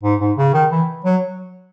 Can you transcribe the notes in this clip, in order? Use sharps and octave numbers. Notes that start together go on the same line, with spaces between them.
G#2
G#2
C#3
D#3
E3
F#3